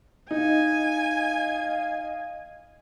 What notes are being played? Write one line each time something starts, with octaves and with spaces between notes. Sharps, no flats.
D#4 D#5 F5 G#5